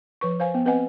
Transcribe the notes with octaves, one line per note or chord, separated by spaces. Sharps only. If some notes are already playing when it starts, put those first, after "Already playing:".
F3 B4 C#6
C5 F5 G#5
B3
C4 B4 D#5 F#5 G#5